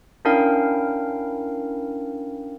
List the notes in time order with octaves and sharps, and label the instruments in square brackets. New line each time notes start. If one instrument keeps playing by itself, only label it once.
[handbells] C#4 D4 E4 A#4 F5 G5